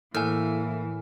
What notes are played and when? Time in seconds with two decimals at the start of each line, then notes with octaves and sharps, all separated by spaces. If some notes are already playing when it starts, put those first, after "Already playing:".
0.15 A2 E3 A#3 G#5 F6